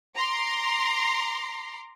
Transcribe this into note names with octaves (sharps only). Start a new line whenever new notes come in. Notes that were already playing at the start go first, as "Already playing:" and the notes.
A#5 C6 D6